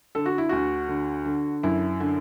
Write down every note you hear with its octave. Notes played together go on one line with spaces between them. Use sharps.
D3 A4
F#4
E4
D2 F#4
D3
D3
F#2 E4
D3